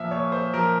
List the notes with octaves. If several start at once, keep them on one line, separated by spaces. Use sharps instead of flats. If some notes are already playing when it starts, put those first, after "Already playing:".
Already playing: A#2 F3 E5
A#2 C#5
C5
F3 A#4